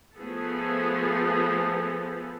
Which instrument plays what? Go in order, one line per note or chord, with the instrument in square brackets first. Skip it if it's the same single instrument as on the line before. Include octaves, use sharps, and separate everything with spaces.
[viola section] F3 A3 B3 G#4 A4